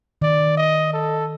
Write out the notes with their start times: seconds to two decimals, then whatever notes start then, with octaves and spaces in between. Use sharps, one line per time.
0.22 D#3 D5
0.57 D#5
0.93 A4